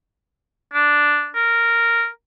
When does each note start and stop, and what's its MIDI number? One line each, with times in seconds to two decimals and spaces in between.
0.73 1.29 62
1.36 2.07 70